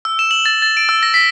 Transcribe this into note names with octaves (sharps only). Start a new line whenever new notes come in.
E6
E7
F#7
A6
A6
D7
E6
A#6
B6